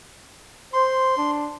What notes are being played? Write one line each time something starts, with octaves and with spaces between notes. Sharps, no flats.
C5 C6
D4